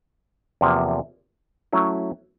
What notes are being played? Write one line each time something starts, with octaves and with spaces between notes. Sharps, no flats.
E2 C3 F3 A#3
F#3 A3 C#4 E4